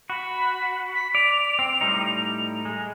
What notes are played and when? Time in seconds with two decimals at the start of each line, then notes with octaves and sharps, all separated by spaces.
0.10 F#4 B5
0.95 B6
1.15 D5 F7
1.59 C4
1.81 A2 G3 D#4
2.65 G#3